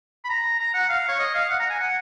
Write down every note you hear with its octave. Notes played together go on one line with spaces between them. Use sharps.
B5
A#5
A#5
F#5
F5
C#5
D#5
F5
F#5
A#5
G#5
F#5